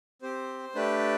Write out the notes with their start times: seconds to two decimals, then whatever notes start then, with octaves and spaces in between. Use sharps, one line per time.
0.22 C4 G4 C5
0.75 A3 D4 G4 B4